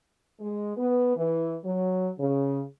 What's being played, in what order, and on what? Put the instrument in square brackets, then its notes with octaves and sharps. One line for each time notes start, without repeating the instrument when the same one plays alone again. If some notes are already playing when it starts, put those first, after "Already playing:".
[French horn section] G#3
B3
E3
F#3
C#3